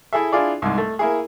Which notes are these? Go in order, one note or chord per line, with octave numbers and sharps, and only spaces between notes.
E4 G#4 A4 E5
D4 E4 F4 G#4 D5
C2 G#2
A3
A#3 E4 G#4